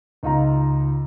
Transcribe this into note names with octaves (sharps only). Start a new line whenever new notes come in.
C#2 D#4 F4 A#5